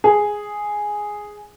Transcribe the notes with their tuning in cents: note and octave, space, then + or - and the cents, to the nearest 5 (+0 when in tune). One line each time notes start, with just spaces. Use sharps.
G#4 +0